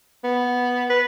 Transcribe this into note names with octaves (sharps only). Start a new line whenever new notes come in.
B3
B4